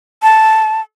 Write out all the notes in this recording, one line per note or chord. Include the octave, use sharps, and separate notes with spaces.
A5